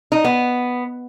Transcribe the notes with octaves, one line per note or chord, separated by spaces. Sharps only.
D#4
B3